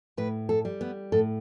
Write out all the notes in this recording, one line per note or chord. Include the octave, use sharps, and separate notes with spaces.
A2 B4
A4
G3
B3
A2 A4